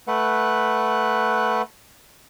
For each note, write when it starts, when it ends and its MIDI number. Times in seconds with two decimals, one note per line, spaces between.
0.08 1.62 57
0.08 1.62 71
0.08 1.62 78